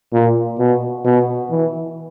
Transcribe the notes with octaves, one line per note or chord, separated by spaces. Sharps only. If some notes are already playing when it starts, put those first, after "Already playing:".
A#2
B2
B2
E3